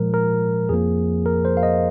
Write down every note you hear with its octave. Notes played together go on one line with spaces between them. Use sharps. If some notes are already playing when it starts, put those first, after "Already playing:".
Already playing: A#2 F3 G#3 A#4
A#4
F2 F3 A#3 G#4
A#4
C5
F5
D#5